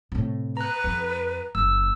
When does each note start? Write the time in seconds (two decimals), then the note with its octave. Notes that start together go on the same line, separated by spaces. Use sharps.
0.12 A2 C3
0.57 B4 A#5 F#6
0.84 F2
1.55 F#1 E6